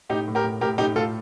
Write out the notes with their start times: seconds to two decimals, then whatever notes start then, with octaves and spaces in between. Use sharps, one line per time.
0.09 A2 D#4 G4
0.28 A2
0.35 G4 A#4
0.44 A2
0.61 A2 G4 A#4
0.78 A2 D#4 G4
0.96 A2 F4 A4